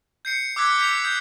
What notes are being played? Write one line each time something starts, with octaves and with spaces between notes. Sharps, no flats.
G6 C7 C#7
D6 E6 F#6 G#6 B6
G6 B6 F7
D#6 G6